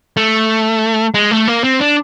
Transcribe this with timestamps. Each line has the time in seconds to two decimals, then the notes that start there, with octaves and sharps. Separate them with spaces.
0.17 A3
1.14 G#3
1.31 A3
1.48 A#3
1.64 C4
1.80 D4